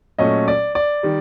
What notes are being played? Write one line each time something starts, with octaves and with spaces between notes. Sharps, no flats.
A#2 F#3 A3 C#4 D#5
D5
D5
D#3 G3